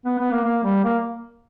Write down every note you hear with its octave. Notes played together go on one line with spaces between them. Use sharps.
B3
B3
A#3
A#3
G3
A#3